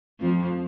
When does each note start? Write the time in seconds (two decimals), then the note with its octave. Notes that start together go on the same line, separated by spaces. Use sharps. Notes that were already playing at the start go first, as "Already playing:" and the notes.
0.21 F2 F3